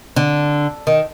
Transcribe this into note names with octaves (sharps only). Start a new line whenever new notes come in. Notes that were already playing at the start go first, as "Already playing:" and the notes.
D3
D#3